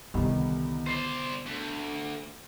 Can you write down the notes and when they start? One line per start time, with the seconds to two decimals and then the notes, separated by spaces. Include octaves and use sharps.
0.14 C2 D3 D#3 B3
0.86 C5 D5 C7
1.46 D2